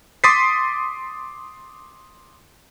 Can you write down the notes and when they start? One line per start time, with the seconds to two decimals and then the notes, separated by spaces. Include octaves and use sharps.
0.24 C6 D6 D#6 A6 B6 C7